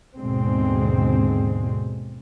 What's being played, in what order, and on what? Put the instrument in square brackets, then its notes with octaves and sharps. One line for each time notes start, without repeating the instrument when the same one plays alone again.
[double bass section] D#2 G#2 B2 D3 G#3 C4